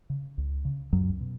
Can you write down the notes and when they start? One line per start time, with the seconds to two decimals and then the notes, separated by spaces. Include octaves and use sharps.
0.10 C#3
0.38 C#2
0.65 C#3
0.93 C#2 F#2 F#3
1.21 B2